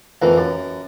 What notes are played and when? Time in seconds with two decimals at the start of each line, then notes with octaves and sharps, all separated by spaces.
0.22 F2 E3 A#3
0.38 F#2